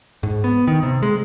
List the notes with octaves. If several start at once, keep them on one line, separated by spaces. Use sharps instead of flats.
G#2
B3
D#3
C3
G#3